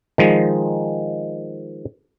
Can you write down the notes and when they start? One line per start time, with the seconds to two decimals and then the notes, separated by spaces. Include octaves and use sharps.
0.18 D#3 F3 G#3